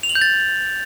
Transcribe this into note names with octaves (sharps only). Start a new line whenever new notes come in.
F7
F#7
G6
A6